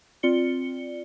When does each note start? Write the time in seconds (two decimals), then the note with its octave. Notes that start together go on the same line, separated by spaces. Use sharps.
0.23 C4 F4 D5 C#7 G7